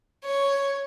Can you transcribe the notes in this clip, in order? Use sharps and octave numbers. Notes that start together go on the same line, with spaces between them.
C#5